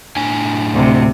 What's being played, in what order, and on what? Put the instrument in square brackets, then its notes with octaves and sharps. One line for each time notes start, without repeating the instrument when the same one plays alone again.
[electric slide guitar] A2 D4 G#5
[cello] D2 C3